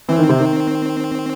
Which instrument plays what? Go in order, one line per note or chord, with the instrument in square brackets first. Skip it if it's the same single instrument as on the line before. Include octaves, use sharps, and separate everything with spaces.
[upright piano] E3 [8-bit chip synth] C4
[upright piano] D#3
C3
D#3